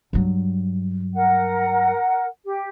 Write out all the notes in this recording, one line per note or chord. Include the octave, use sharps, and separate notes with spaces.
G2 F#3
A#4 F#5
G4